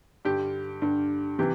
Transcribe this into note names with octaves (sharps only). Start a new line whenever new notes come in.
G2 D3 G4
G2 D3
C3 E3 G4